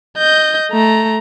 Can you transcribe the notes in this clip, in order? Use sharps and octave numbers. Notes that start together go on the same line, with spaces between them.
D#5 G6
A3 A#5